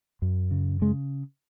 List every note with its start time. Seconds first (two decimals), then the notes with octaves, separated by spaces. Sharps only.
0.22 F#2
0.51 C#3
0.81 C#3 G#3